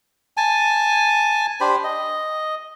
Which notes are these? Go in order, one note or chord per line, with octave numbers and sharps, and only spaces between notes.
G#5 A5
D4 G4 C5 B5
D#5